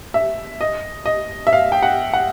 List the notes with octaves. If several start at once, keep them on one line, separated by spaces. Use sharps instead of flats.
E5
D#5
D#5
E5
F5
G5
F#5
F#5